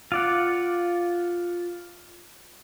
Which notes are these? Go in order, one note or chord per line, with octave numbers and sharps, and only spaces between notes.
F4 D5 F#5